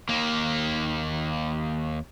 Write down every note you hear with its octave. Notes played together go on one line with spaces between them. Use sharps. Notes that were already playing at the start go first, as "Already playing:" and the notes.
D#2 A#3